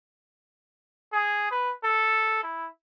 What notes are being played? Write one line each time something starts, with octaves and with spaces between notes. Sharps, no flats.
G#4
B4
A4
E4